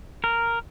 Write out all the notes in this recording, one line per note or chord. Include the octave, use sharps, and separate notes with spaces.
A#4